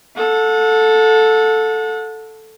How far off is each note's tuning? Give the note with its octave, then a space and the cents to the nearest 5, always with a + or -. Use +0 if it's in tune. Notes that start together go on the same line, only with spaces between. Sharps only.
A4 +0 F#5 -35